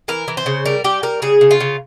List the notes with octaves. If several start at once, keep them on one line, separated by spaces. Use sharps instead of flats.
E3 A#4
E3
C5
C#3
G3 A#4
G3 G4
G3 A#4
C#3 G#4
C#3
F4
C#3